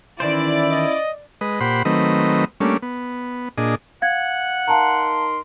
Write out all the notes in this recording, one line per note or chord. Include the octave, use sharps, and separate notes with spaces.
D#3 E3 C#4 E4 C5 D5
D#5
G#3 B4 D#5
A#2 G4 C5 F#5 B5 C6
D#3 F#3 A3 C4 B4 D#5
G3 A3 A#3 C#4 D4
B3
A#2 D4 G#4 D#5
F5 F#5 G#6
D#4 A#4 F5 A5 A#5 C6